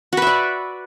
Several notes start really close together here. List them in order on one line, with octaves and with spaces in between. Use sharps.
F#4 B4 E5 D5